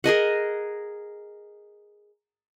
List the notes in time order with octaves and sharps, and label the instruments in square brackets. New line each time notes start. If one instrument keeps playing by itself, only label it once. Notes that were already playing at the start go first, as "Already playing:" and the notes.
[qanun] G#4 A#4 D#5 F#5